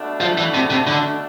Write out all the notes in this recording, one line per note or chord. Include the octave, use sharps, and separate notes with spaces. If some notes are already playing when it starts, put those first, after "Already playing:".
Already playing: B2 A3 D4
F3
E3
C3
C3
D3